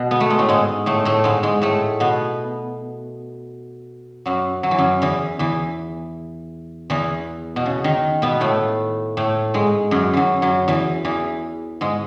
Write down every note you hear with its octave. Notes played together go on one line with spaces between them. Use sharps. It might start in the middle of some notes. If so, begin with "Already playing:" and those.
Already playing: B2
B3
A3
G#3
A2 A3
G#2 G#3
A2 A3
A2 A3
G#2 G#3
G#2 G#3
A2 A3
B2 B3
F#2 F#3
F#3
E3
F#2 F#3
E2 E3
E2 E3
E2 E3
B2
C#3
D#3
B2 B3
A2 A3
A2 A3
G#2 G#3
F#2 F#3
F#2 E3 F#3
F#2 F#3
E2 E3
E2 E3
G#2 G#3